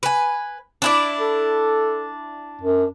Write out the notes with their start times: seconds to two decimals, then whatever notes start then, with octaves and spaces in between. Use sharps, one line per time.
0.03 B4 G#5
0.82 D4 E4 D5
1.20 A4
2.61 F#2